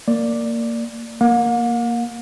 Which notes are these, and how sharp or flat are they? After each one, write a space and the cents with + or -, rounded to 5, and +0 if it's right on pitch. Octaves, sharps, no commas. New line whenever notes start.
A#3 -15 D5 +0
A#3 +0 F5 +45